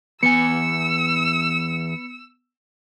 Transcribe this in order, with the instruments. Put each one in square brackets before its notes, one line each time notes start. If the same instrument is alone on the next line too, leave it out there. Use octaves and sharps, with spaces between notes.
[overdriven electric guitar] E2 G#5 [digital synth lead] B3 [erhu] E6 [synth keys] C#7